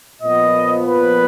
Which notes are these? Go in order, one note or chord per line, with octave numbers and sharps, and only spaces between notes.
A#2 F3 B3 D#5
B4